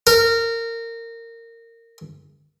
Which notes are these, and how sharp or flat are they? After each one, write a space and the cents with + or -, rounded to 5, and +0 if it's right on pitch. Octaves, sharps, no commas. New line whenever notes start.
A#4 -20